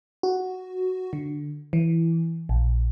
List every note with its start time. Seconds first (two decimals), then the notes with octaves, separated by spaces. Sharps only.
0.23 F#4
1.13 D3
1.73 E3
2.49 A#1